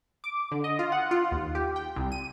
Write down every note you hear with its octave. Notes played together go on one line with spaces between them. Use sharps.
D6
D3
D#5
F4
F#5
F4
D#2
G4
G5
C2
D#7